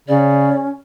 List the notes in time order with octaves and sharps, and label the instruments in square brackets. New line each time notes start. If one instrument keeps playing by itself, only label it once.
[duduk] C#3 [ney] C#4 [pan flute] D5